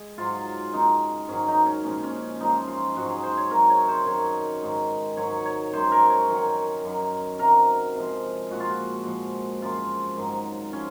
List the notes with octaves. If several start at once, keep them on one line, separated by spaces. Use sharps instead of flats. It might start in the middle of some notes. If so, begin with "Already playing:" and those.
Already playing: G#3 G#4
G#2 F#3 F4
F#2 C#3 G#3 D#4
G#2 D#3 F#3 C#4
D#4
C#4
A#2 F3 G#3 C#4
C#4
F#2 F3 G#3 D#4
F4
G#2 F#3 F#4
G#4
C5
C#5
C3 F#3 A#4
C#5
C5
F#2 D#3 F#3 C#5
G#2 D#3 G#3
G#2 D#3 F#3 C#5
C#5
F#2 D#3 G#3 C5
A#4
C#5
F#2 D#3 F#3
F#2 D#3 F#3
C3 F#3 A#4
C3 F3 G#3
A#2 F3 G#3 F#4
F4
F#4
A#2 F3 G#3
F#2 F3 G#3 F4
G#2 D#3 F#3
F3 C#4